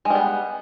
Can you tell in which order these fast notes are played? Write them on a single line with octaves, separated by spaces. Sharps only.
G#3 G3 B3